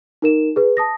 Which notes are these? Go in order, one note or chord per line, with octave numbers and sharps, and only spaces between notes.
D#4 A#4 E7
G#4 B4
A5 D#6 A#6